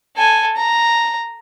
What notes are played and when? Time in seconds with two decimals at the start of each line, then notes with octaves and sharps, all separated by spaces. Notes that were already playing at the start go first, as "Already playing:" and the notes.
0.17 A4 G#5
0.57 A#5